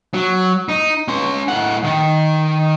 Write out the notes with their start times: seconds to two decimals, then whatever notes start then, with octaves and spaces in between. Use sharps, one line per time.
0.14 F#3
0.69 D#4
1.08 C#4 C6
1.48 A2 F#5
1.84 D#3